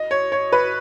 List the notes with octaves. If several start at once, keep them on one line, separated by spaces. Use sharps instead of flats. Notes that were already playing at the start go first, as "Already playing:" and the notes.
Already playing: D#5
C#5
C#5
B4